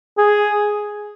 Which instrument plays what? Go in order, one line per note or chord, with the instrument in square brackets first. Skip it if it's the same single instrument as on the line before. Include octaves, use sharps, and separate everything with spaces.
[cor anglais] G#4